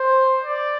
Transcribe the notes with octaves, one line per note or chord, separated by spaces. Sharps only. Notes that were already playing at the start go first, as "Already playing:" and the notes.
Already playing: C5
D5